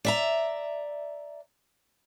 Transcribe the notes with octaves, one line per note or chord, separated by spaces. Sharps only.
D5 E5 A#5